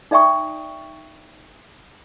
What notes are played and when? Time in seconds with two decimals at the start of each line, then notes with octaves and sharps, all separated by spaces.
0.11 D#4 D5 E5 G5 C#6 D#6